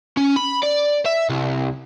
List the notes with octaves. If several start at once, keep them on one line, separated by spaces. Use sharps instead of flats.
C#4
B5
D5
E5
C2